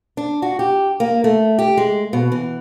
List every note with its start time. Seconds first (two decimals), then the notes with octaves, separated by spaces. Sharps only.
0.17 D4
0.42 F#4
0.59 G4
1.00 A#3
1.24 A3
1.59 G4
1.77 G#3
2.13 B2
2.32 E3